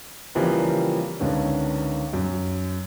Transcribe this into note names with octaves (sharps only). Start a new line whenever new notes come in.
C#3 E3 F3 G3 A#3 C4
C#2 D3 D#3 B3 C#4
F#2